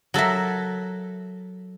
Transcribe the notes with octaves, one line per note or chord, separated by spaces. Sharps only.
F#3 A4 A#4 E5